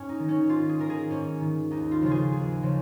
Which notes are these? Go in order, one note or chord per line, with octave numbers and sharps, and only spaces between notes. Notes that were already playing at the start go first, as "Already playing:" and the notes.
Already playing: G#2 C#4
D#4
D#3
C#4
G#2 F4
G#4
D#3 A#4
G#4
G#2 C#4
D#3
D#2 D#4
F4
C#3 F3 F4
G#4
D#2 G#4
C#3 F3